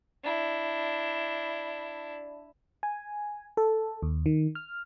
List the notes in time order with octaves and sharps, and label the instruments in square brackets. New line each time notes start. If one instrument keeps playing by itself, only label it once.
[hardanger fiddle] D4 E4
[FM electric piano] G#5
A4
D#2
D#3
F6